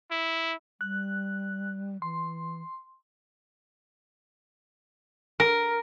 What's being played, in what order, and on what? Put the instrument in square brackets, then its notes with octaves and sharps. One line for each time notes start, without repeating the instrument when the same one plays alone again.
[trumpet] E4
[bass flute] G3 [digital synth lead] F#6
[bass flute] E3 [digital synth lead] C6
[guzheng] A#4